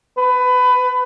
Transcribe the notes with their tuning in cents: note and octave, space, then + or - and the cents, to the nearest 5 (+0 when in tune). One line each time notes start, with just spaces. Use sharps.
B4 +20